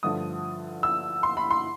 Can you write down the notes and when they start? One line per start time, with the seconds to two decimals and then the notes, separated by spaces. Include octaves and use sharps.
0.03 G2 D3 F3 A3 D#6
0.83 E6
1.23 C6
1.37 B5
1.51 C6